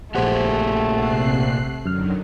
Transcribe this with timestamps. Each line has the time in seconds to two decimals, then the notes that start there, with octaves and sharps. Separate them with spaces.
0.15 A#1 A#2 A3 G4 G#4 C5 F#5
0.94 C3 F#6 C7
1.86 F#2 D3 D#3 F#3 F6